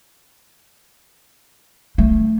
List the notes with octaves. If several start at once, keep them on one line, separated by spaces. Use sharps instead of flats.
A3